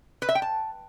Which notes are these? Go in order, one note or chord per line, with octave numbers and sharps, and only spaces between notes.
B4
E5
G5
A5